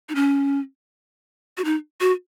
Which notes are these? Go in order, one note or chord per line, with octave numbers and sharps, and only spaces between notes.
D#4
C#4
F#4
D#4
F#4